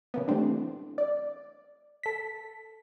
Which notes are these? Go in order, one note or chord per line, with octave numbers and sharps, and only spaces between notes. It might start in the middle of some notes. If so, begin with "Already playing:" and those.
C#3 A#3 B3
E3 G3 A3 C4 D4
D5
A4 B6